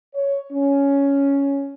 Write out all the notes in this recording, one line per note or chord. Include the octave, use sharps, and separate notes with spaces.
C#5
C#4